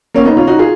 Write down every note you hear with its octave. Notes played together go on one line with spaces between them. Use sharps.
A#3 C#4
B3 D#4
C#4 F4
D#4 F#4
F4 G#4